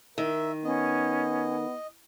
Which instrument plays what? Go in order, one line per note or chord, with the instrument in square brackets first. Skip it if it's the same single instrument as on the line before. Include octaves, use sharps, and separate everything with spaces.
[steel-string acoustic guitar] D#3 [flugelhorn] A#4 [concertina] E5
[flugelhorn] B3 [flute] C#4 [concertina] D#5